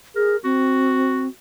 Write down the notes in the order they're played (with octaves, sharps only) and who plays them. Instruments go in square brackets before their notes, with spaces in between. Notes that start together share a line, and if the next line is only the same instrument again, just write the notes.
[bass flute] G#4 [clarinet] A#4
[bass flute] C4 [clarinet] F#4